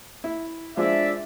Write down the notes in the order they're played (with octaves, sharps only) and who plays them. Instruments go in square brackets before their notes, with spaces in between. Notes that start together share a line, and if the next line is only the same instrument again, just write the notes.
[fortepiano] E4
[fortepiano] F3 G#3 [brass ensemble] D4 D5 E5